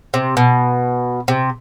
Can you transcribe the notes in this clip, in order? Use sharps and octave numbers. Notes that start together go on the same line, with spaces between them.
C3
B2
C3